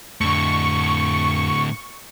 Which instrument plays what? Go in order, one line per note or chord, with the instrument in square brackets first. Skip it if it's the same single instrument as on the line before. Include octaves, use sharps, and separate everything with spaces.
[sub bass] F2 [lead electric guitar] A2 D3 [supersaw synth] C#6